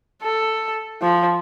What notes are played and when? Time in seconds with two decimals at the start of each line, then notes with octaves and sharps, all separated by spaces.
0.22 A4
1.02 F3